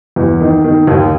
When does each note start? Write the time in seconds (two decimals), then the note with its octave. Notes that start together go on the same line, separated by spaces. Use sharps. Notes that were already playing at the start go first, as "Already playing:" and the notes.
0.16 E2
0.41 D#3
0.64 D#3
0.87 D#2